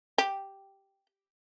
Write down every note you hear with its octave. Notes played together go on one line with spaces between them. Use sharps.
G4